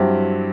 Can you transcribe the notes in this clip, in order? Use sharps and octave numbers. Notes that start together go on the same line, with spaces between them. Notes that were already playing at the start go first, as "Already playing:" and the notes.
Already playing: G2 F#3 C4 E4 G4